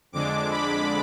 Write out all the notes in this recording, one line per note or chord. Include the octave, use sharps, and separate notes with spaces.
F2 D3 G#3 D4 D6
B5